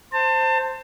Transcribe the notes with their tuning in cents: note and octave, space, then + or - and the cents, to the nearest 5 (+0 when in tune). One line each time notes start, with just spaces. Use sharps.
C5 +0 A5 +30